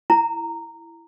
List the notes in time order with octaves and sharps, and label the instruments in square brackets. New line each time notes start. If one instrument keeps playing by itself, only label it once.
[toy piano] E4 A#5